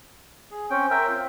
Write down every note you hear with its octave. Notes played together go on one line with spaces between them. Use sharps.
G#4
C4 C#4 G5
A#4 E5 G5
C4 F4